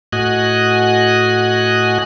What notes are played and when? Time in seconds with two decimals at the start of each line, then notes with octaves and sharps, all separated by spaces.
0.13 A2 F#4 D#5 G#5 F#6